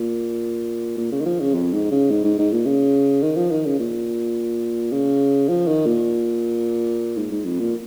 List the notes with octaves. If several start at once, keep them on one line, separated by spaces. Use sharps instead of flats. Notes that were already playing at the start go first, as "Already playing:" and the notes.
Already playing: A#2
A#2
C#3
D#3
F3
C#3
F2
G#2
C#3
G#2
G#2
G#2
A#2
C#3
D#3
F3
D#3
C#3
A#2
C#3
F3
D#3
A#2
G#2
G#2
F2
A#2